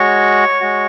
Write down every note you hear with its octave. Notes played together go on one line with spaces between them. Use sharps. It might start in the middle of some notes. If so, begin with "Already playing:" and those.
Already playing: G#3 F#4 C#5 C#6
G#3 F#4